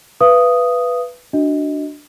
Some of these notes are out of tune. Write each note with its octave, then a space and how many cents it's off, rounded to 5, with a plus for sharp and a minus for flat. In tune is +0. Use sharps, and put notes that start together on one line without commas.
B4 +0 F5 -45 D#6 +0
D4 +5 F#4 +0 D#5 +20